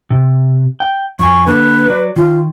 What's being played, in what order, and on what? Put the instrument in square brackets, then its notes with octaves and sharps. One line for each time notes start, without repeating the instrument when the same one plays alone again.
[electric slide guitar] C3
G5
[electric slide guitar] F2 G#5 [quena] C#6
[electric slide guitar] D3 A#3 A5 [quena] B4
[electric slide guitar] F#3 D5
[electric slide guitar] D#3 [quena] F4